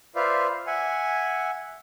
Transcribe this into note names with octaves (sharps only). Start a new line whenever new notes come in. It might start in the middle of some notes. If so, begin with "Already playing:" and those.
F4 B4 C5 D5 E5 F5
E5 F#5 G#5